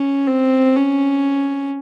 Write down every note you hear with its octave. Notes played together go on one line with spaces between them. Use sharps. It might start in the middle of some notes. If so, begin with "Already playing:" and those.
Already playing: C#4
C4
C#4